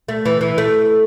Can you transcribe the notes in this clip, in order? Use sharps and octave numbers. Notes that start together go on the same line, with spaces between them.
A3
E3
E3
A3